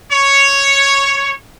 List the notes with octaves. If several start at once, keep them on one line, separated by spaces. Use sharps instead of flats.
C#5